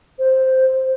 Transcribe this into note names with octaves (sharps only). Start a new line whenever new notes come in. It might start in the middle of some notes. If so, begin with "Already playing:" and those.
C5